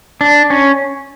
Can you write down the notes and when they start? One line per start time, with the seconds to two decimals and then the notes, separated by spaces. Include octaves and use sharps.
0.21 D4
0.50 C#4